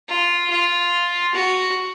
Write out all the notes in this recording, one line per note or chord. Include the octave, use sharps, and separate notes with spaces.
F4
F4
F#4